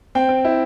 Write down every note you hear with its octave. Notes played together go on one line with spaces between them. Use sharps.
C4 G5
C4
E4